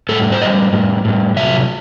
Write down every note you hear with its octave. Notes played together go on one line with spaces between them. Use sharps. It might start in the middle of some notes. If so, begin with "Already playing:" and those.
A2 G3 A4
C5
A2 G3 D#5
A2 G3
A2 G3
C3 F#3 E5